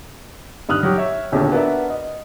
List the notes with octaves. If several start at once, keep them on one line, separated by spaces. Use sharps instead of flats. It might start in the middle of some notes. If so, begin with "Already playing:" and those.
G2 D#3 D#6 F6 F#6
F#3 G4
C#5 E5
A#1 D#2 B2 D3
B3 D4 F#4 A#4 E5
D#5